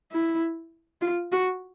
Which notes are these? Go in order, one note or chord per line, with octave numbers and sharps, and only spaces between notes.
E4
F4
F#4